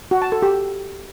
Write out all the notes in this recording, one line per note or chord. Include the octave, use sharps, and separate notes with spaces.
F#4
A5
A4
G4